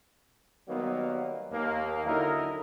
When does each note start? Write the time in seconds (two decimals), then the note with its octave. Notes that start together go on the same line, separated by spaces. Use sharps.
0.69 D#3 F#3 G3 A#3 B3
1.52 D#2 A#3
2.06 D3 F#3 D#4 E4 A#4